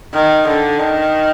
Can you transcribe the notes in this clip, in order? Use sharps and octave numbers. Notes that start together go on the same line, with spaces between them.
D#3
D3
D#3